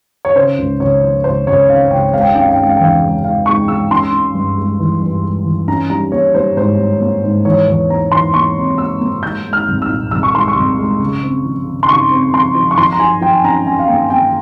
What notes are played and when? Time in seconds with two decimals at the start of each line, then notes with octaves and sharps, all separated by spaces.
0.25 C#5
0.36 C#3 C5
0.58 C#2
0.80 C#2 C#5
1.03 F3
1.24 C#2 C5
1.47 C#2 C#5
1.68 C#3 F5
1.91 C#2 G5
2.13 G#3 F5
2.21 G5
2.28 F5
2.35 C#4 G5
2.41 F5
2.48 G5
2.56 G#3 F5
2.63 G5
2.69 F5
2.77 G5
2.80 E2 F5
3.02 G#3
3.24 G#3 F5
3.46 G#3 C#6
3.68 G#3 E6
3.91 C#4 C6
4.13 C#4
4.35 G2
4.58 G#3
4.80 E3
5.02 G2
5.24 G#3
5.46 E3
5.68 C#4 A#5
5.90 G3 A#5
6.12 A#3 C#5
6.34 G3 C5
6.57 G#2 C5
6.78 G3
7.01 A#3
7.24 G#2
7.45 E3 C#5
7.67 E2 C#5
7.90 A#3 A#5
8.12 E3 C6
8.34 A#3 C#6
8.56 C3
8.78 A#3 E6
9.01 A#3
9.23 G#3 G6
9.45 G#3
9.53 F6
9.68 C2
9.82 E6
9.89 A#2
10.11 C2 E6
10.23 C#6
10.34 G#3 C6
10.48 C#6
10.56 C2
10.78 G#3
11.00 C#3
11.23 C4
11.45 F3
11.67 C#3
11.83 C6
11.88 C#3 C#6
12.11 C4
12.33 F3 C6
12.55 F3
12.71 C#6
12.77 F3 C6
12.93 A#5
13.00 F3 G#5
13.21 F3 G5
13.44 C#4 A#5
13.66 C#4 G#5
13.79 F5
13.88 A#3 G5
14.10 A#3 G5